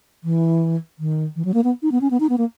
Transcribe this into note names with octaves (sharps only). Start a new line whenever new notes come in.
E3
D#3
E3
F#3
A#3
B3
D#4
B3
C#4
B3
D#4
B3
A#3